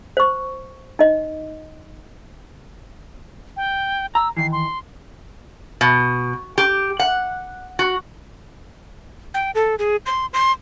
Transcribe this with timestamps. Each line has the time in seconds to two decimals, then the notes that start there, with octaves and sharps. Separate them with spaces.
0.17 C5 C#6
0.99 D#4 D#5
3.57 G5
4.15 A#5 E6
4.37 D#3 E3 C7
4.52 C6
5.81 B2
6.58 G4
6.99 F#5
7.79 F#4
9.34 G5
9.55 A4
9.79 G#4
10.06 C6
10.34 C6